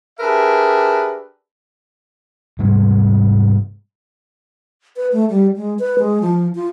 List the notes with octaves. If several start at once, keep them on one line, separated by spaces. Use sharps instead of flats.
D4 G4 G#4 A#4 B4 E5
G#2 C3 G3
B4
A3
G3
G#3
B4
G#3
F3
F4